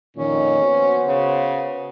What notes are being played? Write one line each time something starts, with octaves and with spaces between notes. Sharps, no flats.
F2 A#2 D#3 C#4
B3 F#4 C5
C#3